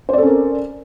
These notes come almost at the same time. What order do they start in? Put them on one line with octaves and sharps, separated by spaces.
C5 D5 A4 C#4 A#4